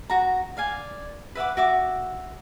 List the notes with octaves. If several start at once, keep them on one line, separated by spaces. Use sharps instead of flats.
F#4 A#5
D5 F5 G#5
B4 E5 F#5 D6
F#4 E5 D6